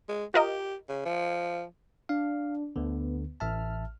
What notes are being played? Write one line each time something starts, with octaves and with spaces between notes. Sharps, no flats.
G#3
F4 G4 A#4 D#5
C#3
F3
D4 F5
D2 D3 B3
A1 E5 A5 F6